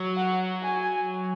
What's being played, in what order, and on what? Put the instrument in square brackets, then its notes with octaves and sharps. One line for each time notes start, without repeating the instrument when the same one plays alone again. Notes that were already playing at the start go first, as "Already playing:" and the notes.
Already playing: [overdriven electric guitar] F#3
[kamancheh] F#5
G#5